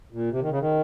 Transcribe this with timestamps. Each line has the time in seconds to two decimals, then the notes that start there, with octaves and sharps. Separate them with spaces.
0.12 A#2
0.32 C3
0.41 D#3
0.51 C#3
0.60 D#3